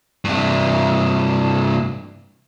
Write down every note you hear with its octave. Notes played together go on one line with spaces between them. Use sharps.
G2 C3